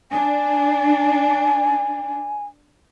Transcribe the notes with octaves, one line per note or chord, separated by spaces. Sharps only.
D4 G#5